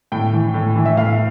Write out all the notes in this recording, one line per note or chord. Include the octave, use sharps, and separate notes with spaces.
A2 G5
E3
A2
E3
E5
A2 F5